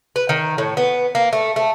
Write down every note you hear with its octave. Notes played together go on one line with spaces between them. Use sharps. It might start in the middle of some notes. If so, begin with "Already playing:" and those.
B4
D#3
A2
B3
A#3
A3
A3